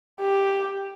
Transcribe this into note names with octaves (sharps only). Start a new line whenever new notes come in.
G4